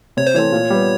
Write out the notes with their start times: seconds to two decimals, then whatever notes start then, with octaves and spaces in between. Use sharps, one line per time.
0.17 C3 C#5
0.27 C5
0.34 E3 A3 C4 C#5
0.52 A#2
0.70 G3 B3